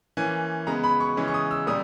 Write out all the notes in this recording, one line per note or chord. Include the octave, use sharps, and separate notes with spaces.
E3 A#3 C#4 G#5
C#3 G#3 B3 A#5
B5
C#6
C#3 E3 G#3 C#4
C#6
D#6
E6
A#2 G3 D#6